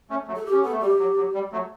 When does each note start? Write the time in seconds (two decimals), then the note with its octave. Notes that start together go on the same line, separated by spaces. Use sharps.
0.10 A3 C#4
0.27 F#3 A3
0.36 A4
0.46 G4
0.52 C#4
0.62 B3 A4
0.72 A3
0.81 G3 G4
0.99 F#3
1.17 F#3
1.34 G3
1.52 F#3 A3